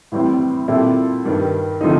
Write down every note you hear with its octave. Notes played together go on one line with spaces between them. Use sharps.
A2 E3 G3 C4
A#2 G3 C4 E4 A4
G2 D#3 G3
D3 F3 A3 C4 D#4